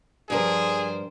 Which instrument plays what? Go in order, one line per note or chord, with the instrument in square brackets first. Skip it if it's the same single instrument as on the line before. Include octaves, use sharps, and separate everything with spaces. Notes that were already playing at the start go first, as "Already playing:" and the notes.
[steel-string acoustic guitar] G2 A#4 [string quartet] F3 C5 G5 [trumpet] G#4